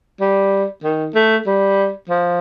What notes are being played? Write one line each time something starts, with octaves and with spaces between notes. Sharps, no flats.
G3
D#3
A3
G3
F3